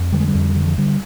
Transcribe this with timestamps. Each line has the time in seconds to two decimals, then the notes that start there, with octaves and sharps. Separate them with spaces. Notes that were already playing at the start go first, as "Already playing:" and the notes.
Already playing: F2
0.12 D3 G3
0.20 G#3
0.28 G3
0.35 F2
0.55 D3
0.66 F3
0.78 D3 G3